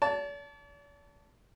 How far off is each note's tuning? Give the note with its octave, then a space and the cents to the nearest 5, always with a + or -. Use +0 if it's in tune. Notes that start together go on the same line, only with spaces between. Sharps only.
D5 -45 A5 +0